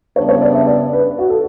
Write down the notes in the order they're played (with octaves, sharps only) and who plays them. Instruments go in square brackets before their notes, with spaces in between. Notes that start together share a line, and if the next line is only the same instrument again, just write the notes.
[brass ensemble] C#3 G3 B3 D4 [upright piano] C#5
[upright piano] C#5
D5
E5
D5
B4
F#4
A4